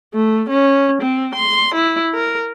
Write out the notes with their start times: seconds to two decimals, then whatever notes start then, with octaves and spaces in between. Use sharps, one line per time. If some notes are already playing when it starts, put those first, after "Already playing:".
0.14 A3
0.50 C#4
1.02 C4
1.35 C6
1.75 E4
2.14 A#4